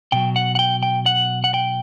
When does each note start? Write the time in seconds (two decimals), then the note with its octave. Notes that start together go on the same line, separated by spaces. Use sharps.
0.12 B2 F#3 G5
0.36 F#5
0.55 F#5
0.59 G5
0.83 G5
1.06 F#5
1.44 F#5
1.54 G5